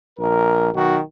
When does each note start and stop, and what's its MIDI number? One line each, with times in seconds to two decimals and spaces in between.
0.18 0.69 34
0.18 0.69 70
0.73 0.98 35
0.73 0.98 51
0.73 0.98 66